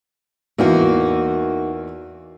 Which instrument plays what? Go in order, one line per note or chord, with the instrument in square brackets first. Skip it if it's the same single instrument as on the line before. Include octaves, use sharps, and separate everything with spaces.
[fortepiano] E2 E3 [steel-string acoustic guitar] A#3 D#4 F#4